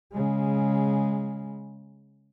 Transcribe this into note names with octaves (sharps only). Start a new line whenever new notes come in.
C#3 G#3